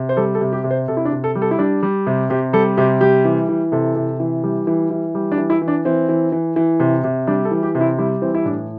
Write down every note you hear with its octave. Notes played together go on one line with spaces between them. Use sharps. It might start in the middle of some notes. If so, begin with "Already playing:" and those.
Already playing: C3
C5
G3 A4
A4
C3
G4
C3
C5
C3 A4
E4
D4
C3
A4
G3
A4
E4
G3 D4
G3
C3
C3 G4
G3 A4
C3 G4
G3 G4
E3
E3
C3 A4
C3
E3
G3
E3
E3
G3
D4
E3
E4
E3
D4
E3 C4
E3
E3
E3
C3
C3
G3 D4
A4
E3
G4
C3
E4
G3 E4
E3 C4
E4
A2 D4